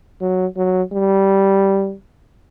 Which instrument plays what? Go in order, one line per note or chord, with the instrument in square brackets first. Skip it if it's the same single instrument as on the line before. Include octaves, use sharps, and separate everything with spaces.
[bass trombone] F#3
F#3
G3